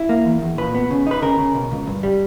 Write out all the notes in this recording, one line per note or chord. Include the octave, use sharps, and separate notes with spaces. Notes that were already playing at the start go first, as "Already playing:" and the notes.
Already playing: E4
A#3
E2
E2
A#2 B4
B3
C#3
D#4 B4
C#3 A#4
C#3
B2
C#2
G2
G3